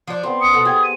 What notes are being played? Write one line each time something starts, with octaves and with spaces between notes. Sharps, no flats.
F3 D4
B3 C4 C5
D#6 C#7
B2 A4
B3 G4 G#4 G#6
D#7